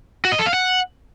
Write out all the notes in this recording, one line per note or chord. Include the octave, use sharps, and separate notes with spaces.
F#4
D#5
A4
F5
F#5